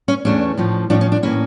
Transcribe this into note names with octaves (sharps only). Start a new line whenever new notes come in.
C#4
E2 E3 A3 C#4 D4
A2 F3 C#4
A2 F3 C#4 D4
C#4
D4
A2 E3 A#3 C#4 E4